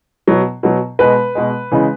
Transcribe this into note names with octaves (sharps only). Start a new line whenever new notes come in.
B2 F#3
B2 F#3
B2 G#3 B4
B2 G#3
C#3 E3 G#3